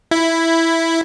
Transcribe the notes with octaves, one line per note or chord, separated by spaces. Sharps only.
E4